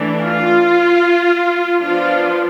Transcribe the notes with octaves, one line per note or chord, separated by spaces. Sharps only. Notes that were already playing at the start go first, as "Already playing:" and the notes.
Already playing: E3 A3 D4
F4
F3 B3 D4 F4